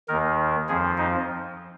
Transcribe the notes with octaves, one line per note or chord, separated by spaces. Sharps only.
D#2 D#3 A#4
F2 F3 G#4
D#4